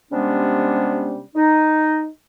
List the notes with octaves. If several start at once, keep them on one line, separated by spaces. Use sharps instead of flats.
C3 G3 G#3 B3 C#4 D4
D#4